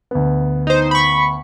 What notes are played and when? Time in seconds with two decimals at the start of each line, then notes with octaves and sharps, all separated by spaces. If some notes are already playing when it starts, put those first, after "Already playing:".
0.11 D2 B3
0.67 D#4 C5
0.91 B5 C#6